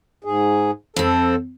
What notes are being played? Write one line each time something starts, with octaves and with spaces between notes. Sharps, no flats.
G#2 G#4
F2 C4 A4